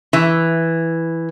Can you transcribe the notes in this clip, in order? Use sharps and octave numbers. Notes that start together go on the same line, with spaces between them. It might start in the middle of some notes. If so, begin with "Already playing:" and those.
E3